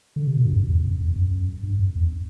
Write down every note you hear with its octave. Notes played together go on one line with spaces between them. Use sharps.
D3
C3
B2
G2
F#2
E2
F#2
E2
F#2
G2
F#2
E2